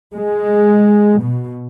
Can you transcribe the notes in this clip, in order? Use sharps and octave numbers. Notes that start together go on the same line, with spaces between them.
G#3
B2